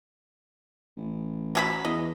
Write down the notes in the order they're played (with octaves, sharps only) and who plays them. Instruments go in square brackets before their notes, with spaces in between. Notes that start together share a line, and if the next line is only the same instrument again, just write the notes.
[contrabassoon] A1
[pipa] F#3 G#4 B5
[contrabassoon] E2 [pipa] D#5